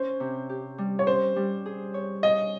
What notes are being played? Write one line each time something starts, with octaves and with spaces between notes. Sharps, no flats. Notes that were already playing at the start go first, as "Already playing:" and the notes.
Already playing: C#4 C5
C3
G4
G3
C#5
C#4 C5
G3
G#4
C#5
G#4 D#5